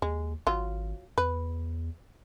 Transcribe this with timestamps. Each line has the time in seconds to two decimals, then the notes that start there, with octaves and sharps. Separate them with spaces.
0.02 D#2 G#3
0.47 G#1 F#3 F4
1.18 E2 B4